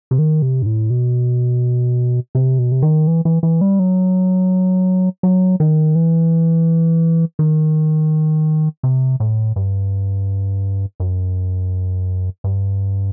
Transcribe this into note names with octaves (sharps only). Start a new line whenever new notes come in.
C3
D#3
C3
G2
A2
B2
C3
B2
C3
D#3
E3
E3
E3
G3
F#3
F#3
D#3
E3
D#3
C3
A2
G2
F#2
G2